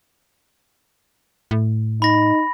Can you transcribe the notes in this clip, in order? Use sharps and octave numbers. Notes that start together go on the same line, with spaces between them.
A2
D#4 B5 A#6